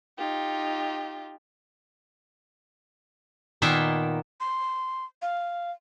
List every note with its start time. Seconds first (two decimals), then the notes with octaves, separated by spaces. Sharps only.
0.17 D#4 F4 G4
3.62 A#2 D#3 A#3 B3 E5 G5
4.40 C6
5.22 F5